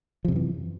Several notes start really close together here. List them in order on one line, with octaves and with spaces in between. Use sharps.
F3 C3 F#2 E3